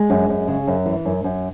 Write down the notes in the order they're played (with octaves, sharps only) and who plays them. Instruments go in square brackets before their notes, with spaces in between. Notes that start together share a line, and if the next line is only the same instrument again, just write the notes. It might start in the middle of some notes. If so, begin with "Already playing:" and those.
Already playing: [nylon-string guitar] G#3
F#2
F#2
C#3
F#2
E3
F#2
F#2